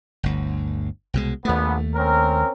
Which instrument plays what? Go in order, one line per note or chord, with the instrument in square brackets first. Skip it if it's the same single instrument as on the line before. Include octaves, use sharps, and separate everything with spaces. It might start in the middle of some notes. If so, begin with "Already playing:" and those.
[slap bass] G1 D2
C2 B2 G#3
[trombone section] A#1 B3 [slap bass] D#2 A3
[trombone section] C4 C#4 A#4